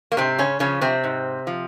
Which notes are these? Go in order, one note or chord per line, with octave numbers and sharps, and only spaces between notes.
A#3
G#2 C3 C4
C#3 C#4
C#3 F3 C#4
C3 C4
G#2
F3